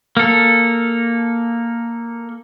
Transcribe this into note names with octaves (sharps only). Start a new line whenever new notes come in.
A#3 A4